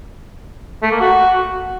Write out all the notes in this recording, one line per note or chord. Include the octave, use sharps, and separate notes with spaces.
A3
A#3
F#4